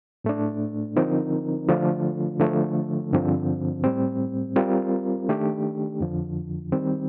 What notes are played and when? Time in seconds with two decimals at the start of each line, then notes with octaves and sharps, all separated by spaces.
0.24 A2 A3 D4
0.96 D3 F3 C4 D#4 A#4
1.69 D3 F3 A3 D4 F4
2.40 D3 F3 A3
3.12 G2 D3 F3 C4
3.84 A2 G3 C4
4.56 G3 C4 F4 A#4
5.29 D#3 A3 D4 G4
6.00 F2 D3 F3
6.72 D#3 G3 C4